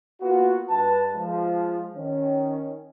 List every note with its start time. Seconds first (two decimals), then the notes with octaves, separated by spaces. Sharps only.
0.21 A#3 B3 F4 F#4
0.69 G2 B4 A5
1.14 F3 G#3
1.96 D#3 C#4